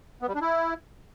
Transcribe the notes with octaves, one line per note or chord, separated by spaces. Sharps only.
B3
G3
D4
E4